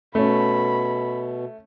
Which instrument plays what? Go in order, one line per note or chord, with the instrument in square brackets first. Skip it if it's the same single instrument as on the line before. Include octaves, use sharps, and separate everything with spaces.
[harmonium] B2 [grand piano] A3 C#4 [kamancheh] B5